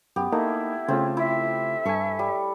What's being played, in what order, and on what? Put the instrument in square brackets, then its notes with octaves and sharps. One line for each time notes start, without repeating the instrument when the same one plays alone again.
[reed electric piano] F#2 [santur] B3 G4
[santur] A3 [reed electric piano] A#3 D#4 [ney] E4
[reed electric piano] C#3 A3 F4 [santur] C4
[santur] E4 [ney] E5
[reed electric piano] G2 G#5 [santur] A4 C#6
[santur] G3